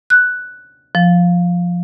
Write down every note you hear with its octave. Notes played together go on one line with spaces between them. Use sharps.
F#6
F3